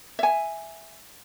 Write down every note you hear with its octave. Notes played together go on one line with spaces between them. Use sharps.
E5 G#5